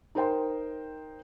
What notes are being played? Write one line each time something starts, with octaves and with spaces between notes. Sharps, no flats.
D#4 A#4 C5 G5 C6